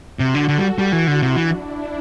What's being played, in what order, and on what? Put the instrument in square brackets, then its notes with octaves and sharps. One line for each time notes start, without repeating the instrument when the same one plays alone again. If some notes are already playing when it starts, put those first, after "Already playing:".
[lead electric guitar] C3 [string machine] F#4
[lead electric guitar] D3
[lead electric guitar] D3 [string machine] A4
[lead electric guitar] G3
[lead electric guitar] G3 [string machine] F#4
[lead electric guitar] E3
[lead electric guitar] D3 [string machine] E4
[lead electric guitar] C3
[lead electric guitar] E3 [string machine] D4
[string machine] E4